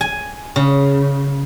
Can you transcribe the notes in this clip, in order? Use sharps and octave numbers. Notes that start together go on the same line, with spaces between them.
G#5
C#3